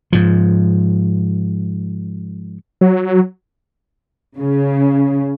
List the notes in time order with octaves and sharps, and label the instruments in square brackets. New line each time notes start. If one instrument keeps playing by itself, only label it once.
[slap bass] G#2 F3
[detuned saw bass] F#3
[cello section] C#3